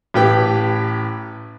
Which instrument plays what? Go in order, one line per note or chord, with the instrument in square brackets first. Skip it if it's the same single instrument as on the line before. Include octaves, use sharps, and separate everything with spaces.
[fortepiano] A1 A2 G4 B4 G5